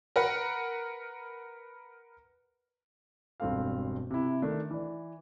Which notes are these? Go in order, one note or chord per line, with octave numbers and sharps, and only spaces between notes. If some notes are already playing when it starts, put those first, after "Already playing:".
A#4 B4 F#5
E1 G2 C4 A4 F5
C3 E4
D3 D#3 A3 D4
E3 D5